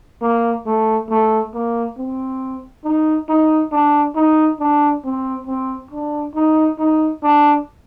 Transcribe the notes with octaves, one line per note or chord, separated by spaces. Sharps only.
A#3
A3
A3
A#3
C4
D#4
D#4
D4
D#4
D4
C4
C4
D4
D#4
D#4
D4